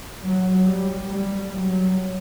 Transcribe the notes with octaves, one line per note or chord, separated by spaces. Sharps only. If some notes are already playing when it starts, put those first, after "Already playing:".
F#3
G3
G3
F#3